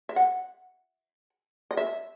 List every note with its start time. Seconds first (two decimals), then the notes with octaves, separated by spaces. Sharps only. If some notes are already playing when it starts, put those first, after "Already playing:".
0.09 E5
0.16 F#5
1.71 D#5
1.77 E5